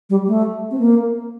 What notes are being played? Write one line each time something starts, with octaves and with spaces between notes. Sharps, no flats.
G3
A3
C4
A#3